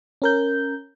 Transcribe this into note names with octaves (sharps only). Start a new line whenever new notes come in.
C#4 A#4 G6